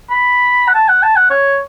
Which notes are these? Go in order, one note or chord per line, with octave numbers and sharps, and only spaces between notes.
B5
F#5
A5
F#5
A5
F#5
C#5